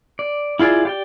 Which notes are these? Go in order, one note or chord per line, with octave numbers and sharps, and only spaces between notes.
D5
E4 F4 G#4 D5
G4 D5 G5